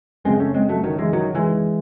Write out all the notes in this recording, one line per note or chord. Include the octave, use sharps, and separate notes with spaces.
F#1 F#2 C#3 G#3 C4
A3 C#4
G#3 C4
F#3 A3
D#3 F#3
E3 G#3
D#3 F#3
E3 G#3